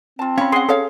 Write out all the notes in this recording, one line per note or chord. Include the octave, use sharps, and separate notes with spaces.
C4 F4 A5
C#4 F5 B5
G#4 F#5 C6
G#4 A4 C#5 F5